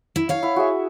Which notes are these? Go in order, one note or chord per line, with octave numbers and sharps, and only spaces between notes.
E4
C#5 F5
E4 F#5
F#4 G#4 E5